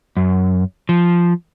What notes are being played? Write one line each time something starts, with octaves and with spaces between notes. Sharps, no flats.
F#2
F3